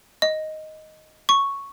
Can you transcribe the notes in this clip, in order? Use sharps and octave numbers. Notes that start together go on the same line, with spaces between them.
D#5
C#6